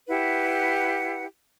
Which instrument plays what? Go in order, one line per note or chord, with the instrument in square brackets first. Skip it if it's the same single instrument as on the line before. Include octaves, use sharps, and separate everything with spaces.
[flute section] E4 G4 B4 F#5